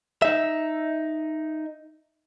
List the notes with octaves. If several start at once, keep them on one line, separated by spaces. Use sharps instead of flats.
D#4 E5